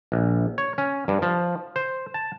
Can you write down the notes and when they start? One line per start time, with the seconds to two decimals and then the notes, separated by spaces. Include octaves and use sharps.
0.12 A#1
0.58 C#5
0.78 C#4
1.08 G2
1.22 F3
1.76 C5
2.14 A5